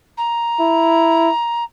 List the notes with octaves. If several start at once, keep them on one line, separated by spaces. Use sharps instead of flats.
A#5
E4